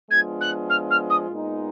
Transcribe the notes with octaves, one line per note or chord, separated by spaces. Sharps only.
F3 G#3 B3 D4 F4 G#6
F#6
F6
F6
D#6
A#2 G#3 B3 D#4